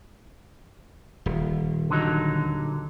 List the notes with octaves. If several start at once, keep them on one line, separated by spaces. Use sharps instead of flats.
D#1
D3 F#3 D#4